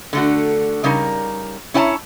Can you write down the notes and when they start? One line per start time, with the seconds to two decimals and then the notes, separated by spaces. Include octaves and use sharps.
0.13 D3 A3 F#4
0.84 C#3 G3 D#4 A#4
1.74 C#4 E4 C#5 G5 A5 A#5